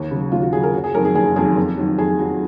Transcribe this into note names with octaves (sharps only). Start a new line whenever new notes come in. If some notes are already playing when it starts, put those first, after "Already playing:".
Already playing: D#2
C#3 F#3
D#2 F4
F#4
C#3 F#3 G#4
A#4
F#1 F#4
G#4
F2 D#3 F#3 A#4
G#4
F#1 G#4
F2 D#3 F#3 G#4
F2
D#3 F#3
F2 G#4
D#3 F#3 F#4